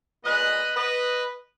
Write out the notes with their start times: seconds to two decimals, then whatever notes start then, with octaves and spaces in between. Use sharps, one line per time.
0.24 A#2 G#3 B3 B4 D#5
0.77 B4 D#5